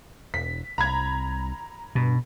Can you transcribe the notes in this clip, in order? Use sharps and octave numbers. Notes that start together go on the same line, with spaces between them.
E1 B6
C2 A#5 B5 G#6
G2 B2